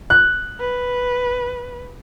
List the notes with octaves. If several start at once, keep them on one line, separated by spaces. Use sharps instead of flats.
F#6
B4